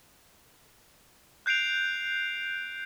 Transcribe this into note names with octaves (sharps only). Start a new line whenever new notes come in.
F#6 G6 C7 D7 F7